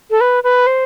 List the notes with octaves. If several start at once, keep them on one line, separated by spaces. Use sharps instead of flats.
A4
B4
B4
C5